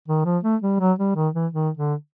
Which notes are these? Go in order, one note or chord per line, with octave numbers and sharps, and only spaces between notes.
D#3
F3
A3
G3
F#3
G3
D#3
E3
D#3
D3